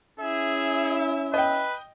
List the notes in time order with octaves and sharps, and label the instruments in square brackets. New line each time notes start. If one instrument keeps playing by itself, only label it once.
[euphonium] C#4 [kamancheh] E4 E5 [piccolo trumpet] G#4
[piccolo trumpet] B4 [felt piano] D#5 G5